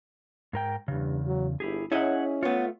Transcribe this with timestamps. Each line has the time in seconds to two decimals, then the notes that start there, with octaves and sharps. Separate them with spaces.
0.53 G#2 A#4 G5
0.88 E2 G2 C#3
1.27 F#3
1.60 G1 E4 G4 G#4
1.92 C#4 E4 G#4 C#5 D#5 F#5
2.43 A3 B3 F4 C#5